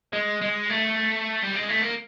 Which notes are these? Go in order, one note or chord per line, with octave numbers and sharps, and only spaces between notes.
G#3
G#3
A3
G3
G#3
A3
A#3